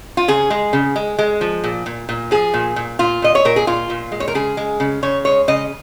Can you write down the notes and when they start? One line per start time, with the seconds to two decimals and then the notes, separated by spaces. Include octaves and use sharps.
0.17 F4
0.28 C#3 G#4
0.50 G#3
0.73 C#3
0.96 G#3
1.19 G#3
1.41 F3
1.64 A#2
1.86 A#2
2.09 A#2
2.31 F3 G#4
2.54 A#2
2.76 A#2
2.99 A#2 F4
3.22 A#2 D#5
3.35 C#5
3.45 A#2 A#4
3.56 G#4
3.67 A#2 F4
3.90 A#2
4.12 G#3
4.20 C#5
4.28 A#4
4.35 C#3 G#4
4.57 G#3
4.80 C#3
5.03 C#3 C#5
5.25 G#3 C#5
5.48 C#3 D#5